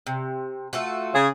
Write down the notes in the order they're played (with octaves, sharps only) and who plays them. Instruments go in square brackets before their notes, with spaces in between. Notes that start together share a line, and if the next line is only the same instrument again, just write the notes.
[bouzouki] C3
A3 F4 F#4
[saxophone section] C#3 G#4